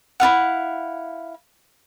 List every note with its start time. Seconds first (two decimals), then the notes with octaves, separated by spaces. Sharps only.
0.20 E4 F4 F5 F#5